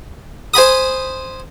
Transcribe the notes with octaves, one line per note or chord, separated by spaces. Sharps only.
C5 G#5 B5 D#6